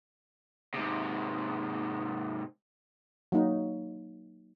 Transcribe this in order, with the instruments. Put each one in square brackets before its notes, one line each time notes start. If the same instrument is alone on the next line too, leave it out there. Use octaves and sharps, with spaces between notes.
[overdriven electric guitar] G#2 C3
[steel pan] F#3 A#3 D#4